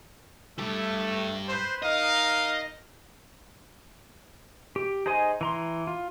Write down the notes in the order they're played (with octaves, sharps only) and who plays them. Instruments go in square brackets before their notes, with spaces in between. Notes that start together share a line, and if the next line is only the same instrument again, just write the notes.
[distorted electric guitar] G2 G4 [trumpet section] A3
[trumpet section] B4 C5
[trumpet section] D#4 A#4 F5 [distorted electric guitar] D#5
[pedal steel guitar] G4
D#4 G#4 C5 D#5 G#5
E3 A#5 C6
F4